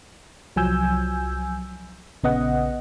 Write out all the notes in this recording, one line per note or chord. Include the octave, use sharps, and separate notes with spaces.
C2 F3 F#3 G#5 E6 G6
A#1 C#3 B3 D#5 F#5